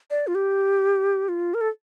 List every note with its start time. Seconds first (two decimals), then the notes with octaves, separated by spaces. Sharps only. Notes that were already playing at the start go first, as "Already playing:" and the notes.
0.11 D5
0.27 F4
0.35 G4
1.28 F4
1.54 A#4
1.61 A4